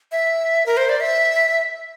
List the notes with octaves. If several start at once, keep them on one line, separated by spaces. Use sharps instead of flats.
E5
A#4
C5
D5
E5